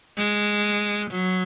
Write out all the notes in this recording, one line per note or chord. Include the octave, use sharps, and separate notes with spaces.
G#3
F#3